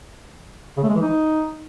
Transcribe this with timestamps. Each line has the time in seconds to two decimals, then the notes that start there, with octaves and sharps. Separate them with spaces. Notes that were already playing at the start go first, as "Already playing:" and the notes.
0.77 C#3
0.83 A3
0.89 G#3
0.95 E3
1.01 D#4